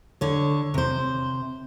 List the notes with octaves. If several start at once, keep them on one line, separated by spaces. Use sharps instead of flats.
D3 C#5
C3 C5